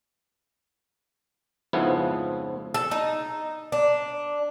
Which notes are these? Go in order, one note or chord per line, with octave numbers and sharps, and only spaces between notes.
F2 G#2 C#3 F3 B3 E4
A4
D#4
D4